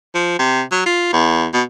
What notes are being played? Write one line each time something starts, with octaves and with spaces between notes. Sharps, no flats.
F3
C3
F#3
F4
E2
B2